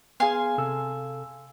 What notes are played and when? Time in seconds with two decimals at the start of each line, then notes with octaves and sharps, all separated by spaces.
0.20 B3 G#4 F5 G#5 C6
0.58 C3 A4 E6